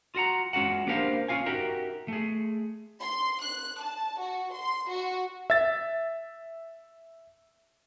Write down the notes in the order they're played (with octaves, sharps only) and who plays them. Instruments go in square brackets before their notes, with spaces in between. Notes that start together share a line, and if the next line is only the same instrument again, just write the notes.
[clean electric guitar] F4 F#4 F#5 A#5
G#3 C#4 F4 F#4 F#5
A#3 D4 G4 A#4 C5 F5
C#4 D#4 F4 F5 G#5
D#4 F#4 G4 A#4 E5
A3 G#4
[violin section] C6
F#6
A5
F#4
C6
F#4
[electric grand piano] E5 A6